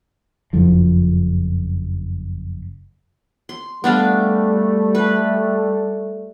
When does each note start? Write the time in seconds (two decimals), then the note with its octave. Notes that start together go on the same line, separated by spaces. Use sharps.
0.53 F#1 F2 F3
3.49 C6
3.84 G3 A3 B3 D4 F5
4.95 B4